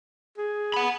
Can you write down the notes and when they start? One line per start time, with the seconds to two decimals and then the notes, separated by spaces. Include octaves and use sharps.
0.38 G#4
0.74 F#5 B5